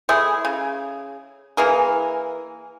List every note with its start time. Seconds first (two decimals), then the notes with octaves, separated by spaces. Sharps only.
0.09 A3 E4 G#4
0.45 C#3
1.57 E3 A#3 G#4 A#4